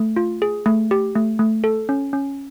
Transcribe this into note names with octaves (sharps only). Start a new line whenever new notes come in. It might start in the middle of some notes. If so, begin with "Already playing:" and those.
Already playing: A3
F4
G#4
A3
G4
A3
A3
A4
C#4
C#4